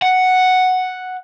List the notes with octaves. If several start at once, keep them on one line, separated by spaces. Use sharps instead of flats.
F#5